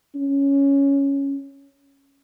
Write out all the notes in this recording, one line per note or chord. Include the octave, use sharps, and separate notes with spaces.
C#4